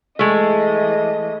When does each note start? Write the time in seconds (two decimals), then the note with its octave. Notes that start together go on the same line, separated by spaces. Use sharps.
0.19 E3 G#3 A3 D#5